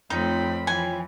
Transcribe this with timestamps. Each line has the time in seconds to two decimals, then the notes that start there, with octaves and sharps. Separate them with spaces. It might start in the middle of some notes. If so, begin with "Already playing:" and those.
0.10 F2 A3 C4 D#4 F4 C#5 G5 B5
0.67 E3 F3 G#5